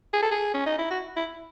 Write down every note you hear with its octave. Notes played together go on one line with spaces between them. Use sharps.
G#4
A4
G#4
C#4
D#4
E4
F#4
E4